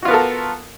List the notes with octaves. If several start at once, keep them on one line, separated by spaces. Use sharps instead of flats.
B3 F4 F#4 A4 A#4